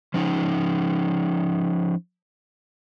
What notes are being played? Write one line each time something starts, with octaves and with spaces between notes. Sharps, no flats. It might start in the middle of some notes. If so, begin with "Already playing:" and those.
F3 C#4 D#4